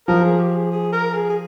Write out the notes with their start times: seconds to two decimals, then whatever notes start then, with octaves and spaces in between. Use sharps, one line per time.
0.08 F3 A#4
0.24 G#4
0.39 G4
0.56 G#4
0.72 G#4
0.92 A#4
1.14 G#4
1.30 G#4